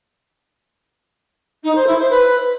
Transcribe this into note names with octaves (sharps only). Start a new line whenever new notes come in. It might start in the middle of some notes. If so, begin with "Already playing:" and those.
D#4
C5
E4
C5
B4